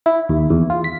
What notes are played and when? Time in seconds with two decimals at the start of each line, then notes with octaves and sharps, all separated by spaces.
0.06 E4
0.29 D#2
0.50 E2
0.70 F4
0.84 B6